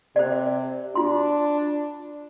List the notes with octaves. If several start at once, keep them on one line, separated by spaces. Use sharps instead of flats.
C3 C5 D5
D4 F4 C6